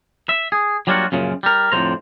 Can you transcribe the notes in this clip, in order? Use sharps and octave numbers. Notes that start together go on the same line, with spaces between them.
E5
G#4
F#3 G3 A#3 D4 F4 F#4
F#2 A#2 C#3 F3
G3 A#4
F2 A2 D3 G#3 C5 A#5